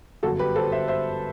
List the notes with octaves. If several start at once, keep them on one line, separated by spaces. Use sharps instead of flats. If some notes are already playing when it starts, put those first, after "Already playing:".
G1 F#2 F#3 F#4 A4
G4 B4
A4 C5
C5 E5
C5 E5